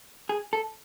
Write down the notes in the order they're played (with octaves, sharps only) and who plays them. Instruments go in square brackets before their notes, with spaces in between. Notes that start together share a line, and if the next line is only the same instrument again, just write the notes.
[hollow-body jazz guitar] G#4
A4